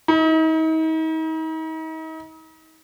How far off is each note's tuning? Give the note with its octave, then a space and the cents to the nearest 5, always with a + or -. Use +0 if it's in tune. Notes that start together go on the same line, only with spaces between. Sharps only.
D#4 +40